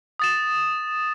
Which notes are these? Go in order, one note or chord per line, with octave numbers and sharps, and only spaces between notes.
D#6 A6 E7